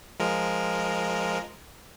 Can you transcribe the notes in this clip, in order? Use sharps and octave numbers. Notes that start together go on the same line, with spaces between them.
F3 G#3 A#4